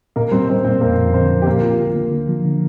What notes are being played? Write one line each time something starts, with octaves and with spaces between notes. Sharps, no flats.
A#2 A#3 A#4
G3 C4 C5
A#2 C4 C5
A#2 C4 C5
F2 A#3 A#4
F2
D3 C4 C5
F3
G4
D2 A#3 A#4
F4
D3
A#3
D3
F3
D3